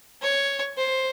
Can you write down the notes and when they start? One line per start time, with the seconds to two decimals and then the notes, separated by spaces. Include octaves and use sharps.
0.22 C#5
0.77 C5